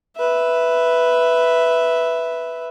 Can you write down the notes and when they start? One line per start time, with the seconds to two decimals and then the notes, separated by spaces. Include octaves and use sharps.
0.17 B4 E5